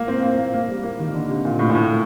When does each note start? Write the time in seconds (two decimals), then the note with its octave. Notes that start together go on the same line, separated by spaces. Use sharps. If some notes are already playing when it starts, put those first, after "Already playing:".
Already playing: A#3
0.08 C4
0.23 A#3
0.38 A#3
0.54 A#3
0.68 G3
0.83 A#3
0.99 D#3
1.15 D3
1.29 C3
1.45 A#2
1.59 A2
1.70 A#2
1.75 A2